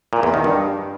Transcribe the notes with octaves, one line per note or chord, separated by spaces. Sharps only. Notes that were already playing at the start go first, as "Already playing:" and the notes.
A#2
E2
D#3
G2